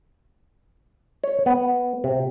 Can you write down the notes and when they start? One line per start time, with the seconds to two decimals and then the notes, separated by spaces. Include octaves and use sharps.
1.24 C#5
1.46 B3
2.04 C3